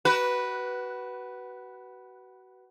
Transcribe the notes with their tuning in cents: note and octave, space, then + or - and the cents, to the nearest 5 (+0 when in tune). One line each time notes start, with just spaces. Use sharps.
F#4 +25 B4 -5